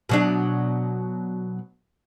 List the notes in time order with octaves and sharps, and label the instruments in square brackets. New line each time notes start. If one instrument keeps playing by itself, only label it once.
[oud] B2 F#3 D4